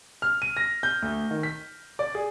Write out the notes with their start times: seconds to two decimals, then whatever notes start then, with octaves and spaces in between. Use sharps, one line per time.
0.22 F6
0.42 D#7
0.57 A#6
0.83 G6
1.02 D2
1.31 D#3
1.43 B6
1.99 D5
2.15 G#4